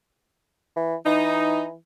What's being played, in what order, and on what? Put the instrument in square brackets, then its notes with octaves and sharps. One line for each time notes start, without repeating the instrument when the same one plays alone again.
[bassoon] E3
[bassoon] E3 [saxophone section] D#4